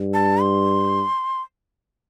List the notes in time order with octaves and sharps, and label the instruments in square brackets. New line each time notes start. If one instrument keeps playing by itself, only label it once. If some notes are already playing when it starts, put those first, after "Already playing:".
Already playing: [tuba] G2
[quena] A5
C6